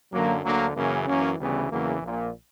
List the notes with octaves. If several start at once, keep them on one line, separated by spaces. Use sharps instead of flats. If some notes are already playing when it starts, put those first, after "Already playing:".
F#2 D3 F#3 A#3
D2 D3 F#3 A#3
F#2 C#3 E3 A#3 C#4
F#2 E3 A#3 C#4
D2 C#3 E3 G3 B3
E2 C#3 E3 F#3 A#3
A#1 A#2